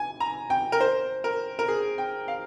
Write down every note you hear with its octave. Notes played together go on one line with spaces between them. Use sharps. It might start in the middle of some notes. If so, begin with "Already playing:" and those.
Already playing: G#5
A#5
G5
A#4
C5
A#4
A#4
G#4
G5
F5